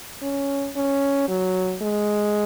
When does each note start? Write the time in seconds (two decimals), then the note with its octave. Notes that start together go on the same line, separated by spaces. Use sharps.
0.22 C#4
0.76 C#4
1.29 F#3
1.82 G#3